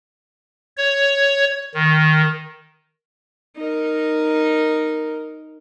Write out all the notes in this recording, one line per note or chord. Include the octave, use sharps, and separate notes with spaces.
C#5
D#3
D#4 A#4